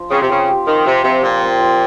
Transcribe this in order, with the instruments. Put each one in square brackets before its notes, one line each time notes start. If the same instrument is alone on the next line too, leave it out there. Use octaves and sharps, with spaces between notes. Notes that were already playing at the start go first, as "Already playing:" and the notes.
Already playing: [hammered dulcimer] F3
[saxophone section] C#3 [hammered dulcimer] C4
[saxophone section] C3
[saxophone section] C#3 [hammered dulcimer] F3
[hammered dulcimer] G4
[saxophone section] D#3 [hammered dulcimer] F3
[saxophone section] C3 [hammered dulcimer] F4
[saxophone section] C3 [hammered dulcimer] F3
[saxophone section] A#2 [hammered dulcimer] C4
[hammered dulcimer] C4
F3